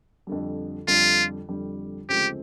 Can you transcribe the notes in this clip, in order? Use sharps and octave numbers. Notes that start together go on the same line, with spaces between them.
F2 D3 G3
F2 D3 G3 F4
F2 D3 G3
D2 C#3 F3 G#3 C4 G4